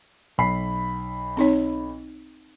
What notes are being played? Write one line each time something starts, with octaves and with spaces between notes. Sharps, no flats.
B1 B5 C7
C4 D#4 C#5